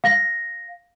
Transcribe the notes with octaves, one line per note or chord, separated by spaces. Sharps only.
F5 A#6